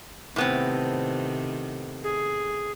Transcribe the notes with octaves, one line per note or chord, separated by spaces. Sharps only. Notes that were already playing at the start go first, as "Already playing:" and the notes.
A2 C3 D#3 B3 C4
G#4